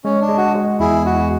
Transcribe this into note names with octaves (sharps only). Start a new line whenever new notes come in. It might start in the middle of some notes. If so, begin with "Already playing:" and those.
G#3 C#4
D4
G#3
F#4
G#3
E2 E4 G#4
G#3 F#4